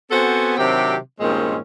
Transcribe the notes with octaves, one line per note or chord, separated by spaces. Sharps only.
B3 C4 F#4 A4 C5 G#5
C3 D#3 F#3 C4 D4 G4
G2 A#2 D#3 G#3 C4 C#4